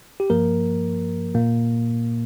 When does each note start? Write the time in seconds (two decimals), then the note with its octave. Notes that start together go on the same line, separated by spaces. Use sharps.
0.20 G4
0.30 G2 F3 A#3 A#4
1.35 A#2 A#3